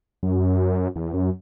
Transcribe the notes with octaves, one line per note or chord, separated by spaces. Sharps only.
F#2
E2
F#2